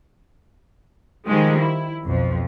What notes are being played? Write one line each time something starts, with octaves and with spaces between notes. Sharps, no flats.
D#3 F3 G3 G#3
E4
B1 F2 F3